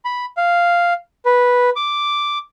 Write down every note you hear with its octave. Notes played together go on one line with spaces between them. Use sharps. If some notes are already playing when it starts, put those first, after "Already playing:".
B5
F5
B4
D6